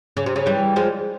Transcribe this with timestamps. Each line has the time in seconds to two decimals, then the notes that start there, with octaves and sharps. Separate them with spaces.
0.17 C#3
0.26 C3
0.36 C#3
0.46 E3 G3
0.76 F3 G#3